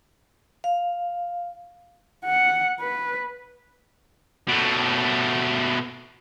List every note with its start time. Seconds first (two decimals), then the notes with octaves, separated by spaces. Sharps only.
0.64 F5
2.25 F#5
2.80 B4
4.49 B2 A3